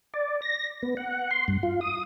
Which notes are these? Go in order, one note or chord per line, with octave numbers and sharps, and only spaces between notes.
D5
A#6
B3
F#5
C6
G2
F4
D#6